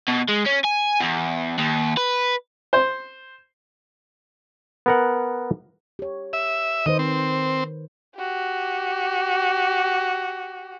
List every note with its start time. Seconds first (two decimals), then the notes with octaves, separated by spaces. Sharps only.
0.08 B2
0.28 G#3
0.46 C#4
0.64 G#5
1.00 E2
1.58 D#2
1.97 B4
2.73 C5
4.86 B3 A#4 F#5
5.99 G4 C#5
6.33 E5
6.86 D#3 B4 C5 D#5
6.99 C4
8.16 F#4 G4